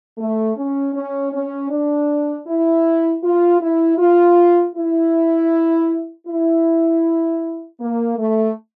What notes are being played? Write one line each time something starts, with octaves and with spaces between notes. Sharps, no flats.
A3
C#4
C#4
C#4
D4
E4
F4
E4
F4
E4
E4
A#3
A3